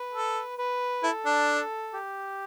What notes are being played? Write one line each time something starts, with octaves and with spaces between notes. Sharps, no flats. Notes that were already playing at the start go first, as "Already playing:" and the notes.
Already playing: B4
A4
B4
E4 A4
D4
G4